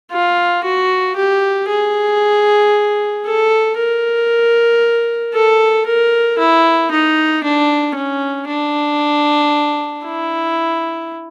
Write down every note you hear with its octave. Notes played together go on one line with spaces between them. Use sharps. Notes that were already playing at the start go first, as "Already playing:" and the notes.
F4
F#4
G4
G#4
A4
A#4
A4
A#4
E4
D#4
D4
C#4
D4
E4